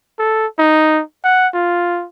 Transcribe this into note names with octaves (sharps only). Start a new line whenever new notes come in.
A4
D#4
F#5
F4